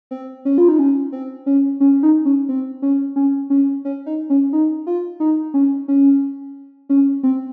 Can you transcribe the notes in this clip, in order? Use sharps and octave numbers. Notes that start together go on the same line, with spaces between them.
C4
C#4
F4
D#4
C#4
C4
C#4
C#4
D#4
C#4
C4
C#4
C#4
C#4
C#4
D#4
C#4
D#4
F4
D#4
C#4
C#4
C#4
C4